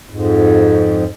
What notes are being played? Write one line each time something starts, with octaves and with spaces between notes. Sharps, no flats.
F2 G#2